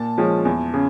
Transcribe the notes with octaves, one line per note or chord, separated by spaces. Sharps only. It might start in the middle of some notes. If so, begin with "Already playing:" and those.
Already playing: A#2 A5
F3 G#3 C#4
E2
C#3